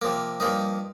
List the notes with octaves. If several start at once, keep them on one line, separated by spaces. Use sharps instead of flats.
C3 F3 A#3
G2 F3 A#3 D#4